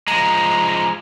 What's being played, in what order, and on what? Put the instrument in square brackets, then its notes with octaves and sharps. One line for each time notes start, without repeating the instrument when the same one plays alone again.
[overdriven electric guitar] F3 G#3 [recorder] A#5